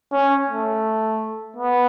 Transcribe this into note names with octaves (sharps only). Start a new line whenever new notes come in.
C#4
A3
B3